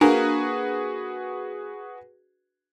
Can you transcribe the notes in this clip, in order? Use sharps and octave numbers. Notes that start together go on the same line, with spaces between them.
A#3 D4 F#4 G#4 A#4 B4